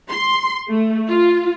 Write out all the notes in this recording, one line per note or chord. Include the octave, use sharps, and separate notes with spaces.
C6
A3
F4